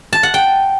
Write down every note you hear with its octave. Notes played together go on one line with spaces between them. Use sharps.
A5
F#5
G5